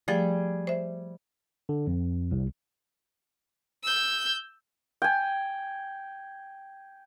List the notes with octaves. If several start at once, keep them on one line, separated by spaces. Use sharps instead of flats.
F3 G3 A3 G#4
C5 E5
D3
F2
C2
E6 G6
G5 G#5